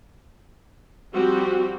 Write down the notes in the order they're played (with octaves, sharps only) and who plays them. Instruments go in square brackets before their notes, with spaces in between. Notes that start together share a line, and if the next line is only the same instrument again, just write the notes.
[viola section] F3 G3 C4 F#4 G4